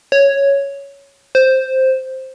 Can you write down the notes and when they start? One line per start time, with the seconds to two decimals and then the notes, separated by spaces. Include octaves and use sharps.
0.12 C#5
1.35 C5